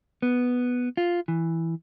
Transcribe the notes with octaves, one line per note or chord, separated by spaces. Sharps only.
B3
F4
E3